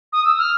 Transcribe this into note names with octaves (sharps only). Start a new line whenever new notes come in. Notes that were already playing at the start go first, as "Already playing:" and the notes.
D#6
E6
F6